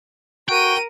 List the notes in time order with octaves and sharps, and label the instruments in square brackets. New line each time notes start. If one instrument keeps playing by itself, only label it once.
[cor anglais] F#4 [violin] A#4 D#7 [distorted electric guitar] G5